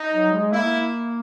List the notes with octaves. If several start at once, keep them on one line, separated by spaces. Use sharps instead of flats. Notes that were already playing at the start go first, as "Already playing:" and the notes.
Already playing: D#4
F#3
G#3
A#3 E4